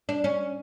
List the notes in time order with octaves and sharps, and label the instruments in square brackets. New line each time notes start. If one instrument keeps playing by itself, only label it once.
[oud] D4
C#4